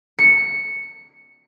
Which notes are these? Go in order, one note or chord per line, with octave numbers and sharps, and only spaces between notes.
C#7